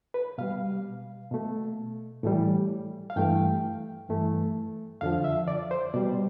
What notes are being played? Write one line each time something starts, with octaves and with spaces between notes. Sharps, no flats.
B4
B2 G3 F5
B2 A3
A2 E3 G3
F5
G2 E3 A3 G5
G2 E3 A3
F2 D3 F3 F5
E5
D5
C5
B2 G3 D5